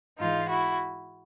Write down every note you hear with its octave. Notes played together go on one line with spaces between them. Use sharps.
G#2 E3 G#3 D#4 F4
E4 F#4